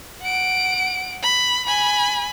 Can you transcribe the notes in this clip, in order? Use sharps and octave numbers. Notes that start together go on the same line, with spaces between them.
F#5 D7
B5
G#5 B5